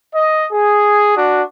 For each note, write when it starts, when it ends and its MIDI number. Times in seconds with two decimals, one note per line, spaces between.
0.15 0.47 75
0.52 1.13 68
1.16 1.42 62
1.16 1.42 66